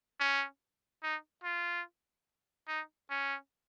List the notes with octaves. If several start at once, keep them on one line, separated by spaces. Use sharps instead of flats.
C#4
D#4
F4
D#4
C#4